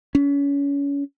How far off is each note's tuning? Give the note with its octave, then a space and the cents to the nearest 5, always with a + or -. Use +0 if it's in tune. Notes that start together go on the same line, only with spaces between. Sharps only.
C#4 +30